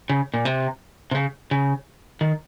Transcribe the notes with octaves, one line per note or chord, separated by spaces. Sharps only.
C#3
A#2
C3
C3
C#3
C#3
D#3